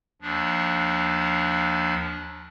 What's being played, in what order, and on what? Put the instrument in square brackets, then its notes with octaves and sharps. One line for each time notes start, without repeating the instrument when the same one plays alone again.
[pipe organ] D#2 F3 D4